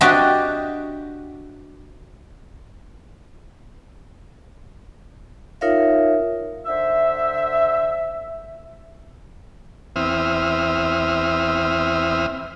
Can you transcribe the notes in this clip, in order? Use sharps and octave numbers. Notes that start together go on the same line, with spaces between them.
D4 F#4 G4 D#5 E5 C6
D#4 F4 A#4 C#5 E5 F5
D3 C5 E5
E2 C4 E5 D#6 F6